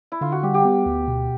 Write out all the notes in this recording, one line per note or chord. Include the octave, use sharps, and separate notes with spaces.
E4
D3 F4
F#4
G3 G4
G4
B3
D2
B2